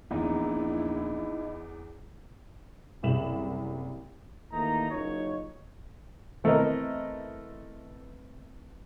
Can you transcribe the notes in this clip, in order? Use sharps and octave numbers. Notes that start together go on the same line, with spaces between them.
A#1 E2 D#4 E4
F#1 C2 E7 F#7
D#2 E3 A3 A#3 D#4 A#5
F#1 F#2 D#4 F4 C#5
E3 A3 B3 C4 A#4 D#5